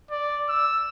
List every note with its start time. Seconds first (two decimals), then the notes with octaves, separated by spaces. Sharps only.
0.10 D5
0.49 E6